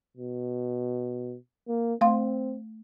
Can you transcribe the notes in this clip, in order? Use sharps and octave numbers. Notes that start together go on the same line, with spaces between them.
B2
A#3
A3 C4 F5 C6